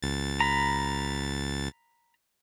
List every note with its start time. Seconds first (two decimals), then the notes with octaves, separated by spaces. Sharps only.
0.02 C#2 A6
0.40 A#5 B5